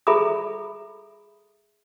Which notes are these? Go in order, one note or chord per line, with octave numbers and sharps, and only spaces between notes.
G#4 A4 E5 A#5 B5 D#6